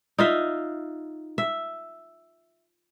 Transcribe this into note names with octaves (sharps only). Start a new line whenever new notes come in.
D#4 F4 E5
E5